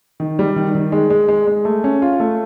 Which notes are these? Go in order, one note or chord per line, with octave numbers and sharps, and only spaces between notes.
D#3
G3
D#3
D#3
G#3
G#3
G#3
G#3
A3
C#4
F4
A3